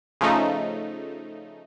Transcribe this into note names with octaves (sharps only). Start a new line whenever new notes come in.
C#3 F3 A3 D#4